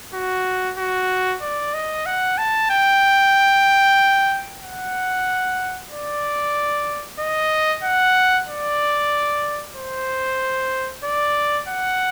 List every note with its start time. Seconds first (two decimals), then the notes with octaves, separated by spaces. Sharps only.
0.14 F#4
0.78 F#4
1.42 D5
1.74 D#5
2.06 F#5
2.38 A5
2.70 G5
4.63 F#5
5.91 D5
7.19 D#5
7.83 F#5
8.48 D5
9.76 C5
11.04 D5
11.68 F#5